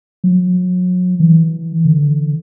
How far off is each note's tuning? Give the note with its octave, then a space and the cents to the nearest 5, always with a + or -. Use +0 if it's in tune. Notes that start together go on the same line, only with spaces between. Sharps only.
F#3 -35
E3 -20
D3 -10